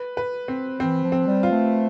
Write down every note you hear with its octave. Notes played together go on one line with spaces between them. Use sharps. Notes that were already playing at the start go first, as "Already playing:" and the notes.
Already playing: B4
B4
C4
E3 C4
F3
C4
G3
F4
A3